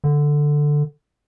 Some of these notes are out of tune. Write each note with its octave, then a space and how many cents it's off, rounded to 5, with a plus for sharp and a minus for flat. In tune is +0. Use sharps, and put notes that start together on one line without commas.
D3 +5